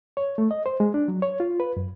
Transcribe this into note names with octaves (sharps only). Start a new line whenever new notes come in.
C#5
A3
D#5
C5
G#3
D4
F#3
C#5
F4
B4
F#2